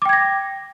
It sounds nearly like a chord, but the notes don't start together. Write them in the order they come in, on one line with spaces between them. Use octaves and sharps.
D6 G5 G#6 A#6